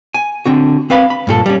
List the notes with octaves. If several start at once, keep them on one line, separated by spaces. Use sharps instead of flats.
G#5
D3 C4 F#4
C4 B4 F5 B5
B5
G2 A#2 A4
G3 C#4